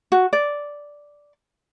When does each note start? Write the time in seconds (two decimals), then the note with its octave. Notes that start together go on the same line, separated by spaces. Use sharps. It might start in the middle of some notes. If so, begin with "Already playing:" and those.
0.12 F#4
0.33 D5